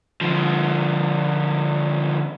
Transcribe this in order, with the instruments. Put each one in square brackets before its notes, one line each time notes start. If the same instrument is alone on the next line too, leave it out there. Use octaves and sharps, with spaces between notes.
[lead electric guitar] D3 F3